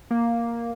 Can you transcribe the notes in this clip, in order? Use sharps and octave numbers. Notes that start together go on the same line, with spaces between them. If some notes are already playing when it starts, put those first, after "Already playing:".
A#3